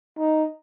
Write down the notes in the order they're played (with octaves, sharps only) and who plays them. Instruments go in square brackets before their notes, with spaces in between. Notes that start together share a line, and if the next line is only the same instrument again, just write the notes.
[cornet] D#4